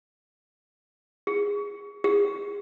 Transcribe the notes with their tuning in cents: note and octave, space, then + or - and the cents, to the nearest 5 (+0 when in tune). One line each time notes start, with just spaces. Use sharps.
G#4 -20
G#4 -35